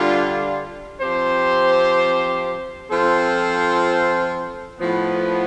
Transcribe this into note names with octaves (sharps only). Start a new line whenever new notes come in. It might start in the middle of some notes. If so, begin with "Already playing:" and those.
Already playing: D3 G3 D4 F4
F3 C4 G4 C5
F3 C4 F4 A4 C5
A2 F3 B3